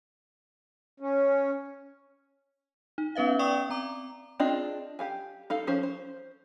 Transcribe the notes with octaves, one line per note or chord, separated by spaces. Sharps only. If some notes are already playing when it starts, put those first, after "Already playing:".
C#4
D#4
B3 C#4 B4 E5 F5
D5 G5 C#6 D#6
C4 A#5 D6
C4 D4 F4 G#4 D#5
G4 F5 G#5
D#4 A4 F5
F3 C#4 C5
C5